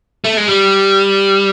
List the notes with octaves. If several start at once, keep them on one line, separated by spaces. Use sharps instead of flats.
A3
G#3
G3